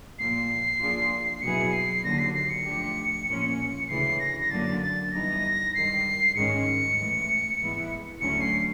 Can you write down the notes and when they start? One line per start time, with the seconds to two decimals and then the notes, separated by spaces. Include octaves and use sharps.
0.19 A#2 F3 A#3 C7
0.80 F3 A#3 D4 F4 G#4
1.42 B2 F#3 B3 E4 G#4 C#7
1.73 C7
2.03 D#2 D3 F#3 A#6
2.19 C7
2.34 C7
2.50 C#7
2.65 F3 A3 D4 G4
3.27 A#2 F3 A#3 C#4
3.88 D2 C#3 E3 C7
4.19 A#6
4.40 A#6
4.50 F#2 D3 F#3 A#3 D4 A6
4.81 A6
5.12 G2 E3 G3 B3 D#4 A#6
5.74 G2 D#3 G#3 C7
6.35 G#2 D#3 G#3 C#4 C#7
6.97 A2 E3 G#3
7.59 G#2 E3 G#3 B3 E4
8.21 D2 D3 F#3 A3 C#4 C#7
8.41 C7